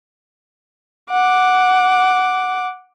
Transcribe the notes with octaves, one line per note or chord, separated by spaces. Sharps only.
F#5 D6